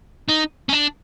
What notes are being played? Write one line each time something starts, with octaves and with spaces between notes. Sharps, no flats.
D#4
C#4
D4